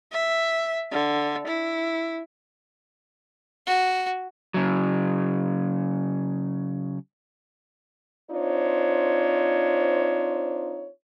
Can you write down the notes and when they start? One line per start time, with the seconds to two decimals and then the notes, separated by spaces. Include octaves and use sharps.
0.12 E5
0.91 D3
1.48 E4
3.67 F#4
4.54 C#3 F#3
8.31 C4 D4 D#4 F4 C5 C#5